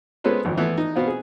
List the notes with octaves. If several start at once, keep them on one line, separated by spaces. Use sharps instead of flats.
G#3 B3 C#4 A4 B4 C5
G#1 F2
E3 A3 B3 E4
D#4
B2 B3 C4 F4
G#4